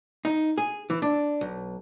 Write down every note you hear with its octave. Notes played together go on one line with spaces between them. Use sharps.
D#4
G#4
E3
D4
B1